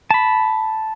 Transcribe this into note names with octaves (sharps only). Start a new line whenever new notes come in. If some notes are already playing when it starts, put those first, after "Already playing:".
A5 B5